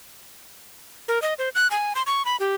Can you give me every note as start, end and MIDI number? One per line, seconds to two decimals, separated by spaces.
1.08 1.21 70
1.22 1.34 75
1.39 1.49 72
1.55 1.68 90
1.71 1.93 80
1.95 2.02 84
2.06 2.25 85
2.25 2.36 83
2.40 2.55 67